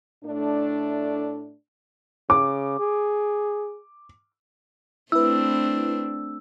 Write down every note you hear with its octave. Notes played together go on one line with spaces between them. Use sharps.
A2 A3 D4
C#3 D6
G#4
A3 C4 D4 E4 B4 E6